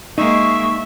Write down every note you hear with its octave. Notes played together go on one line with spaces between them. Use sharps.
G#3 A#3 D#4 E5 C#6